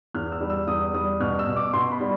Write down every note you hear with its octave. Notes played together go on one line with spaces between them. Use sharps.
E2 F6
E6
G3
E6
E2 D#6
G3 D#6
B2 F6
E6
B2
D6
B2 C6
B5
G3